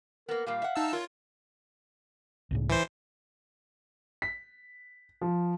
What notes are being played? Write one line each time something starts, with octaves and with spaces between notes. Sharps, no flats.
A#3 B3 A#4
A#2 G3 A#3 F5
E5 F#5
D#4 A5 E6
F4 A#4 C#5
C#2 A2 C#3
E3 C5
B6
F3